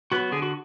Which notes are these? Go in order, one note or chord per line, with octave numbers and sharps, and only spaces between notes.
F#3 B3 F#4
D3 G#4
F#4